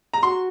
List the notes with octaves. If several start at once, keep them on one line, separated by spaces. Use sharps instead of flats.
A#5
F#4 C6